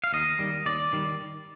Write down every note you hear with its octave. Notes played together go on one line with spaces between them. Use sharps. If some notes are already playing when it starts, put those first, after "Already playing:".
F5
D#2 D#5
D#3 G3
D#2 D5
D#3 G3